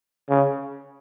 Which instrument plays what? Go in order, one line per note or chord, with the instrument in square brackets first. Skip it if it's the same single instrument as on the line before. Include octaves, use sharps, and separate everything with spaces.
[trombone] C#3